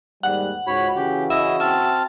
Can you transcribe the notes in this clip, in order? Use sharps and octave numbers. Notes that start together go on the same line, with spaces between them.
D#2 G#2 G3 F#5
C#2 G#2 F#4 C#5 B5
C#3 E3 C#4 G4
E4 D#5 E5 D#6
C4 E5 A5 F6